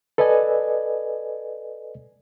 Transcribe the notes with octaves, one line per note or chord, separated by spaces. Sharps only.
A4 B4 D5 D#5 G#5